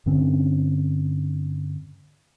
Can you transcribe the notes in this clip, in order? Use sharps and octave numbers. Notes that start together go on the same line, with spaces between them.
G2 D3 C4 C#4